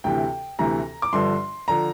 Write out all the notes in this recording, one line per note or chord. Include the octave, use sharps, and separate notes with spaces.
D2 C3 E3 G5
D2 C3 E3 A#5
D6
G1 G2 D3 F3 C6
D3 F3 A#5